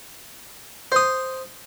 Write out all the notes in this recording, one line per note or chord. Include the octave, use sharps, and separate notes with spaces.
C5 D#6